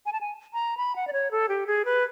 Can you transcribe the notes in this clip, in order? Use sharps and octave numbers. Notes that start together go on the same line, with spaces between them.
G#5
A5
G#5
A#5
B5
F#5
D5
C#5
A4
G4
G#4
B4